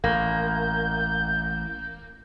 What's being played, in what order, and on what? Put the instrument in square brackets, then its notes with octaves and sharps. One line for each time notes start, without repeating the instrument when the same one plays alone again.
[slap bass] A1 [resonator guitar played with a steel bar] A#3 [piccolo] G6